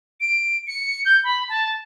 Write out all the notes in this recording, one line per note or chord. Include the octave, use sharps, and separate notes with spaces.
D7
C#7
G6
B5
A5